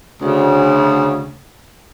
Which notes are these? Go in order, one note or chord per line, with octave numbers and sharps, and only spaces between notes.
D2 C#3